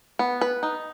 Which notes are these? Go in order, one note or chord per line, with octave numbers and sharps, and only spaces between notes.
B3
B4
D#4